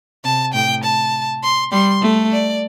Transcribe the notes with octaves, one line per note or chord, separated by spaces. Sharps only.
C3 A5
A2 G5
A5
C6
G3 C6
A3
D5